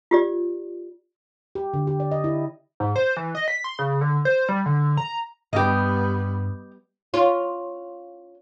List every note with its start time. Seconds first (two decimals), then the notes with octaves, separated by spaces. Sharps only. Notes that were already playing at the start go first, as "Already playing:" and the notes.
0.11 F4 G4 D5
1.55 G4
1.74 D3
1.87 G4
2.00 D5
2.11 D#5
2.24 E4
2.80 G#2
2.96 C5
3.17 E3
3.35 D#5
3.48 B6
3.64 C6
3.79 C#3
4.01 D3
4.25 C5
4.49 G3
4.66 D3
4.97 A#5
5.53 G2 G3 B3 G4 D#5
7.14 C#4 F4